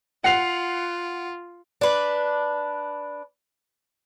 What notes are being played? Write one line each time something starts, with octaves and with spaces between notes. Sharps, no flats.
F4 F#5 C7 F7
D4 B4